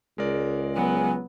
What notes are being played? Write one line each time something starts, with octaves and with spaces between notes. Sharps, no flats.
C#2 G#3 A#4 D5
F#3 B3 G#5